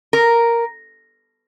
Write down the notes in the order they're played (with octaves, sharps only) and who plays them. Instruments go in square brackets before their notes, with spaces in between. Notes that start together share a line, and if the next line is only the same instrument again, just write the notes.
[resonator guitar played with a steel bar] A#4